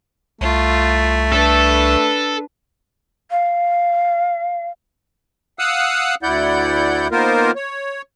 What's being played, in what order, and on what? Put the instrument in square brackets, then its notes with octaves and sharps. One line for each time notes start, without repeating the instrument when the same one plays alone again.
[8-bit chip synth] C2 [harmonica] A3 [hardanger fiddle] F4
[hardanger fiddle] D4 B4 [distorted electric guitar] A4
[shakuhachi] F5
[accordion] F5 F#5 D#6 E6 F#6
D2 E4 D5 F#5 G6
D#3 A#3 B3 F4 A#4 C5
C#5